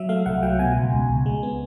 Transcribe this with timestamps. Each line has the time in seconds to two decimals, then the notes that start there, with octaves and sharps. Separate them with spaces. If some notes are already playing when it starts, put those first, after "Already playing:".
Already playing: F#3 E5
0.09 A3 F5
0.26 C2 F#5
0.43 F#3 G5
0.59 B2 G#5
0.76 C#2
0.93 C#2
1.09 C#2
1.26 G#3
1.43 B3